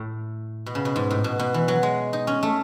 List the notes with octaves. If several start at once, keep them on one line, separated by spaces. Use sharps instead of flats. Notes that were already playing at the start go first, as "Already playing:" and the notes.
Already playing: A2
B2
C#3
B2
G#2
A2
B2
B2
E3
F#3
G#3
D#4
C#4
A3